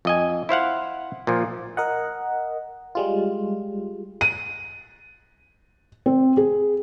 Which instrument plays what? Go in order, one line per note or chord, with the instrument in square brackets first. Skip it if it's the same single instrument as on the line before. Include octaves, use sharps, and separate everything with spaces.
[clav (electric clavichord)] F2 D#5 G#5
E4 C5 F5 F#5
A#2 F3
[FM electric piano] A#4 D#5 F#5
G3 G#3 F4
[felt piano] D#7
C4
G#4